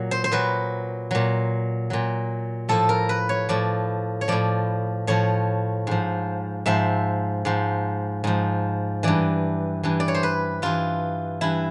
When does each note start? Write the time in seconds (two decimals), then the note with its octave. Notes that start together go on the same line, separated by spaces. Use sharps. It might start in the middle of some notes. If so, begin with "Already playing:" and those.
Already playing: A#2 F#3
0.11 C5
0.24 C5
0.31 A#2 F#3 B4
1.11 A#2 F#3
1.90 A#2 F#3
2.69 A2 F3 A4
2.89 A#4
3.09 B4
3.29 C#5
3.49 A2 F3 D5
4.21 C#5
4.28 A2 F3 D5
5.07 A2 F3 C#5
5.87 G#2 F3
6.66 G#2 F3 E5
7.45 G#2 F3
8.24 G#2 F3
9.03 G2 E3 D5
9.83 G2 E3
10.00 D5
10.08 C#5
10.15 C5
10.23 B4
10.62 G2 E3 F4
11.41 G2 E3 E4